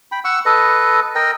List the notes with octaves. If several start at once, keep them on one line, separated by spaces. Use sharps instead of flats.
G5 B5
F#5 C#6 E6
A4 B4 D#5
A#4 D#5 G5